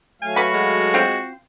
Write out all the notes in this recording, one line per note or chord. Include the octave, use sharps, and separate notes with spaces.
F#3 A3 F5 G#5
F#4 B4 B5
G#3
C4 F4 C5